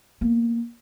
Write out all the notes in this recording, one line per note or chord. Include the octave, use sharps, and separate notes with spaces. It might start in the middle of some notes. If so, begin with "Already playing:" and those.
A#3 B3